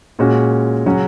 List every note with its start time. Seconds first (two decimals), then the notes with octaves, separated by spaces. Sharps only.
0.19 A#2 G#3 C#4 F#4
0.86 C#3 F#3 C#4 F#4